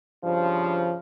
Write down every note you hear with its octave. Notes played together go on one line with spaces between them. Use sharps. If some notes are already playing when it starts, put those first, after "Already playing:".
G2 C#3 F3